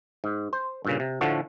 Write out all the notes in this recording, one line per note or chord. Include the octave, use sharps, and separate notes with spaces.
G#2
C5
G2 A#2 C#3
C3
A2 D3 F3 A3 F#4